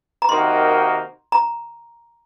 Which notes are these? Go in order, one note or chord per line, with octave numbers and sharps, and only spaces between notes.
A#5
C3 D#3 A#3 D#4 F#4 C6
A#5